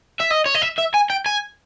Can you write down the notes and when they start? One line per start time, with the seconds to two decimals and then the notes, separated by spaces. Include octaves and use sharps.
0.20 E5
0.30 D#5
0.46 C#5
0.55 D#5
0.62 E5
0.78 E5
0.94 G#5
1.10 G5
1.26 G#5